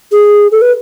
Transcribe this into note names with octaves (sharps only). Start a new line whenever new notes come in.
G#4
A4
B4